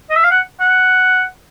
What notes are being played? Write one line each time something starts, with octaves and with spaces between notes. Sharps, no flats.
D#5
E5
F5
F#5
F#5